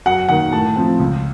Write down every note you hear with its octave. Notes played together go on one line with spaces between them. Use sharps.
F#2 F#5
D#3 A#3 F#5
A2 A5
F3 C4
C#2